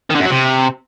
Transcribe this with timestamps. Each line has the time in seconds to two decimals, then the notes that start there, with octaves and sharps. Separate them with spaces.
0.10 D#3
0.15 D3
0.20 F#2
0.25 F#3
0.30 C3